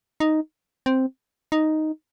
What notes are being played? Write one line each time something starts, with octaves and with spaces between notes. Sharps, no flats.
D#4
C4
D#4